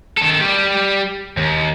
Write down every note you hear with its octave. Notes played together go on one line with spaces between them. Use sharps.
D#3 A4
G3 G4
D#2